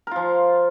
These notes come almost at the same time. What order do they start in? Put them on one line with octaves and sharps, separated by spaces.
A#4 F4 F3